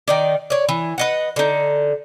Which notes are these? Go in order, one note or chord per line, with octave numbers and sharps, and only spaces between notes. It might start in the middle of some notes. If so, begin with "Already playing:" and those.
D#3 D#4 D5
C#5 D5
E3
B4 D#5 F#5
D3 D#4